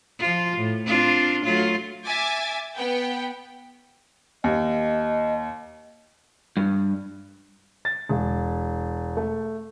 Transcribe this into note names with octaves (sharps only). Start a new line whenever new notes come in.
F3 F4
A2
C4 D4 F4
F#3 A3 F4
E5 G#5 D6 A6
B3 G5
D#2 D#5
G2
A6
E1
A3